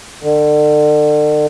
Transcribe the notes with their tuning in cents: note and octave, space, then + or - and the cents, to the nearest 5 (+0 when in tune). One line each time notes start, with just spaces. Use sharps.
D3 +35